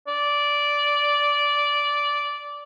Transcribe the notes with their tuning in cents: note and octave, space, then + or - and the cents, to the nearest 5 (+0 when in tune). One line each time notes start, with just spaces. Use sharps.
D5 -10